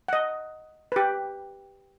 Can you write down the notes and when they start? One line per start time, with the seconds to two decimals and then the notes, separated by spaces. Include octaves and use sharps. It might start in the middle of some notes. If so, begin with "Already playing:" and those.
0.08 D#5 F#5
0.92 G4 B4